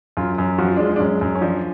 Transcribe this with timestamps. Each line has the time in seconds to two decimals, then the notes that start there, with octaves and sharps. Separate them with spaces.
0.17 F#2 F4
0.38 F#2
0.58 F3 F#4
0.67 F4
0.77 G#3 D4
0.85 F4
0.96 D4
1.00 F#2 C#4
1.21 F#2
1.35 C#4
1.42 F3 D4